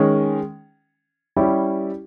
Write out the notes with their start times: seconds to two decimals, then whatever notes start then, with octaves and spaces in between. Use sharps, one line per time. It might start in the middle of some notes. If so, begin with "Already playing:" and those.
Already playing: D#3 G#3 C#4
1.36 G3 C#4 E4 G4